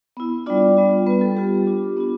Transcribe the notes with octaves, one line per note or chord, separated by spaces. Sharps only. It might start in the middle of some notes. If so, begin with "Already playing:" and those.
B3 E4
G3 B3 D4 F4 D5
G3 B3 F4
G3 B3 F4 B4
A4
G3 B3 F4 G4
B3 D4 F4
B3 D4 F4